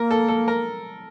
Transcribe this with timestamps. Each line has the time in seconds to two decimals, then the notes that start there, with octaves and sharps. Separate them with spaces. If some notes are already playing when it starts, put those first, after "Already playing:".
Already playing: A#3 A#4
0.11 A4
0.28 A4
0.48 A#4